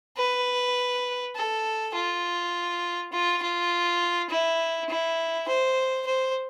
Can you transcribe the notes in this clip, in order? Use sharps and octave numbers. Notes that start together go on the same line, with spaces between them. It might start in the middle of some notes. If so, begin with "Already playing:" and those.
B4
A4
F4
F4
F4
E4
E4
C5
C5